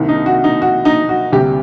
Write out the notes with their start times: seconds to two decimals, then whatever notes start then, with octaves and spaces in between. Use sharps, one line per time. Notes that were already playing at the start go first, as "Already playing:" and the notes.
Already playing: C2 C3 D#3
0.09 D#4
0.26 F#4
0.44 D#4
0.62 F#4
0.85 D#4
1.09 F#4
1.33 D2 C3 G3 G4